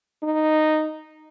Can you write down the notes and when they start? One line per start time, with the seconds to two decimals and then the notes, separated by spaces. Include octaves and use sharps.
0.23 D#4